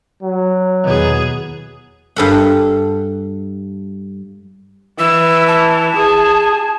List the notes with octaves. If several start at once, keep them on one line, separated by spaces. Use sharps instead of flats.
F#3
E2 B2 D#3 B3 G#4
G2 A4 F#5
E3 E6
A5
G#4